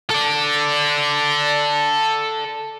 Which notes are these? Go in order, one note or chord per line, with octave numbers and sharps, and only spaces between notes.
A4 D5